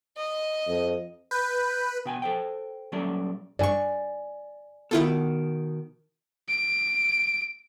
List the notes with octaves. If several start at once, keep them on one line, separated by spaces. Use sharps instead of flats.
D#5
F2
B4 G6
B2 G5 G#5
A4 C5 G5
A#2 F#3 G3 C#4 A4 D5
G2 D5 G#5 C#6
B2 D#3 E4 F4 A4
D7